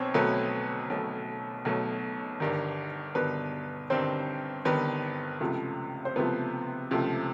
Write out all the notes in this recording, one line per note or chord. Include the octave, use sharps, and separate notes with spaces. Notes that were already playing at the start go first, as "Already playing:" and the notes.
Already playing: B1 B2 F#3 C4 C5 C#5
B1 B2 F#3 A3 B3 B4
B1 B2 F#3 A3
B1 B2 F#3 A3
G1 G2 D#3
G1 G2 D#3 B3 B4
G1 G2 D#3 C4 C5
G1 G2 D#3 B3 B4
C#2 C3 F3 A3
C5
C#2 C3 F3 A3 B3 B4
C#2 C3 F3 A3